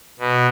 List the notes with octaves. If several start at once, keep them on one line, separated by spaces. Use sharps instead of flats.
B2